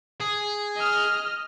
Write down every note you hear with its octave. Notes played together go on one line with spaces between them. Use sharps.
G#4
D#5 F6